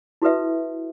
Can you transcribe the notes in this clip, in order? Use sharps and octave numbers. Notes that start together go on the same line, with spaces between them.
E4 F#4 A4 B4 E5